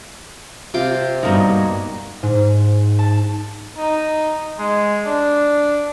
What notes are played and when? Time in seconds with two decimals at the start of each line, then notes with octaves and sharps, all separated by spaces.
0.74 C3 F4 C6 D6
1.23 G2 A#3 B3 D#4 F#4 A#4
2.23 G#2
2.99 A5
3.78 D#4
4.59 G#3
5.06 D4